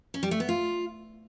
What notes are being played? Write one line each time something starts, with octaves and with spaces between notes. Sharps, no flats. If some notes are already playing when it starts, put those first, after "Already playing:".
C#4
G3
A3
B3
F4